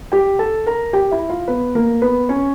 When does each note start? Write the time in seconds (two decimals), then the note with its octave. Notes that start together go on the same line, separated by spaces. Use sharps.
0.12 G4 G5
0.39 A4 A5
0.66 A#4 A#5
0.93 G4 G5
1.11 E4 E5
1.29 F4 F5
1.48 B3 B4
1.75 A#3 A#4
2.02 B3 B4
2.29 C#4 C#5